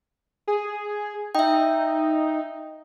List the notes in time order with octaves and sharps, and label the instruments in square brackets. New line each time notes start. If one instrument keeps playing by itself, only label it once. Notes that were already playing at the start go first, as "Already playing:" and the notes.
[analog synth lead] G#4
[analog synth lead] D#4 [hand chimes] E5 G5